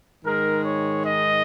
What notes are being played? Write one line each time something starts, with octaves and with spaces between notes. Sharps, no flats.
G#2 D#3 G#3 A#4
C#5
D#5